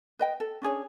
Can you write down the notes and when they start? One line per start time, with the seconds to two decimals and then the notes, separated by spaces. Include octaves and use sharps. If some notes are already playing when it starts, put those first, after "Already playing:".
0.19 B4 D#5 G5
0.40 A4
0.62 C#4 D4 G#4 C#5